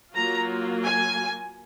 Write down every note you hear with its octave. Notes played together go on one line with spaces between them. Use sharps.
F#3 A#3 F4 A#5
G#5